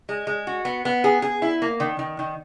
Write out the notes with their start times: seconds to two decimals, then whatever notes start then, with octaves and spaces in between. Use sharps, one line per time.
0.09 G#3
0.27 G#3
0.47 F#4
0.65 B3
0.85 B3
1.04 G#4
1.22 G#4
1.42 E4
1.62 A#3
1.80 D#3
1.99 D#3
2.19 D#3